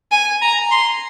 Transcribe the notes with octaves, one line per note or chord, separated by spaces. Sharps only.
G#5
A#5
C6